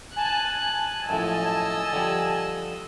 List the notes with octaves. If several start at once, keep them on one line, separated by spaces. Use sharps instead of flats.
G#5 A5 F#6
F#2 A2 F3 D#5 E6
D3 F3 G3